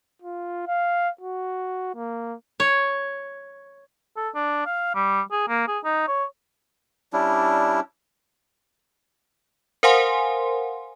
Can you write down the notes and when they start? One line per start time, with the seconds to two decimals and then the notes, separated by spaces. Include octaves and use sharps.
0.22 F4
0.67 F5
1.21 F#4
1.95 A#3
2.60 C#5
4.16 A4
4.35 D4
4.66 F5
4.95 G3
5.31 G#4
5.48 A#3
5.68 G#4
5.84 D#4
6.08 C#5
7.13 G3 C#4 D4 E4
9.83 A#4 C5 F5 F#5 G#5 C6